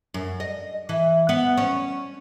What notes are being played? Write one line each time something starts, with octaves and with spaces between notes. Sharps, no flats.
F#2
D#5
E3
B3
C#4